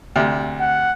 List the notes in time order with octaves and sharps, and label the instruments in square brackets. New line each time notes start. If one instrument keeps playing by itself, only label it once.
[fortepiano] D2 C3
[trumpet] F#5